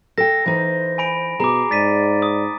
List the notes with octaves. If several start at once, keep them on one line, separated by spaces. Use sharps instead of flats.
A4 G5 A#6
E3 D#4 C5
G#5 B5 D7
B2 G#4 A#5 D6
G#2 D5 A6 B6 D#7
D#6